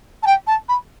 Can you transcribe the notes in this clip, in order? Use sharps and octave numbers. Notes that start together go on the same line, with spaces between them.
A5
G5
A5
B5